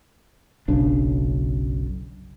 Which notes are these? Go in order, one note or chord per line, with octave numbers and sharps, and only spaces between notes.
F#1 B1 C#3 D4